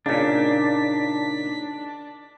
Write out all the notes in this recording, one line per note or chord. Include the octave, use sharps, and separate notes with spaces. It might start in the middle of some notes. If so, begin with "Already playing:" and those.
A#2 C#3 D4 D#4 B6